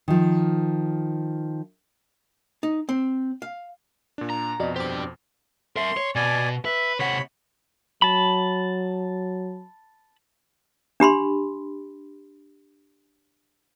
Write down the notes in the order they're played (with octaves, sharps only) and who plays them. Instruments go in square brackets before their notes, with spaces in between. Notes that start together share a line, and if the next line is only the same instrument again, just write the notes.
[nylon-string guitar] D#3 F3
[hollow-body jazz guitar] D#4
C4
F5
[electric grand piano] A#2 D4
[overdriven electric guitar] A#5
[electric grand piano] F2 B2 [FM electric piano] F#4 D5 D#5
[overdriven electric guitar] D4 G4 [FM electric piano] C5 D6
[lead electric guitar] A#4 E5 [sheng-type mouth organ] C6
[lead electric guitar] C#5
[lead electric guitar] B2 [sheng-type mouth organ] D5 G#5
[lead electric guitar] B4 [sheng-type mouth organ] E5
[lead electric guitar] C3 F#5 [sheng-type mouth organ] C#5 B5
[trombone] F#3 [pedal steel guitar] A5 B5
[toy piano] D4 G4 B5 C6